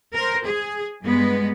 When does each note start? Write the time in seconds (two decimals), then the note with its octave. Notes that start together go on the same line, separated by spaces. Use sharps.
0.14 A#4 C5
0.45 G#4
1.03 G2 G#3 B3